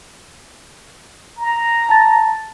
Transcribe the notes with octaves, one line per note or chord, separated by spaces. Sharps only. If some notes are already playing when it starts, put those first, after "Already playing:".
A#5
A5 A6